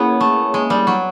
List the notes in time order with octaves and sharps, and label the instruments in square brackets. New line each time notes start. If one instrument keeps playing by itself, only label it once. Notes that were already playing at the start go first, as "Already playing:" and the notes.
Already playing: [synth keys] A#3 C#4 E4 G#4 C#5 [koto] B3
[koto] A3
G#3
G3
F#3